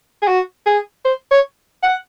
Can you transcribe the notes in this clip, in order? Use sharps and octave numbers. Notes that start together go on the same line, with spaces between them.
G#4
F#4
G#4
C5
C#5
F#5